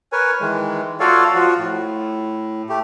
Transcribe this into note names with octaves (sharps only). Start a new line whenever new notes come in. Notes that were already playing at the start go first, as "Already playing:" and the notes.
A#4 B4 C#5 G#5
D#3 E3 G#3
F4 F#4 A4 C#5 D5 F5
F3 F4 F#4
A2
A3 G4